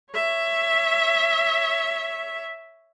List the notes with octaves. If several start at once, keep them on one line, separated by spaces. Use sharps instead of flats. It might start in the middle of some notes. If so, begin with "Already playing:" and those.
C#5 E5